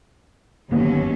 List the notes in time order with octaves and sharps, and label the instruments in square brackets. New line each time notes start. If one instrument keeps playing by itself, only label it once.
[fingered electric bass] G1 A#3 B3 [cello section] D#2 F#3 C#4